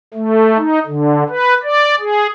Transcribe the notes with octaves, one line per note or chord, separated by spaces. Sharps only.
A3
D#4
D3
B4
D5
G#4